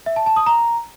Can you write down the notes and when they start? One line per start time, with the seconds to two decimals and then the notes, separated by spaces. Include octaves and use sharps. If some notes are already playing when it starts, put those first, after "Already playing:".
0.06 E5
0.16 A5
0.26 A5
0.36 D#6
0.46 A#5